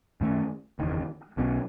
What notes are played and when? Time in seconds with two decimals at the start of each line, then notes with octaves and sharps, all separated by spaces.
0.21 F#2 D#3 A3 C#4
0.79 F#1 E2 D#3
1.37 B1 B2 F#3 C#4